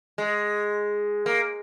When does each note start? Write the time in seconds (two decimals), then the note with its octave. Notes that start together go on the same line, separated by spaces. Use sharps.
0.18 G#3
1.26 A#3